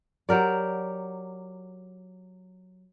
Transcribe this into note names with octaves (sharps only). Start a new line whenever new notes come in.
F#3 G4 A#4 D5